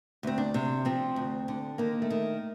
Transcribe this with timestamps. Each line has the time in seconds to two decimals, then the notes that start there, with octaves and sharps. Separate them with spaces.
0.23 D2 C4
0.38 D4
0.54 C3
0.85 F3 C4
1.16 D2
1.48 D3
1.78 D#3 A#3
2.02 A3
2.10 D#3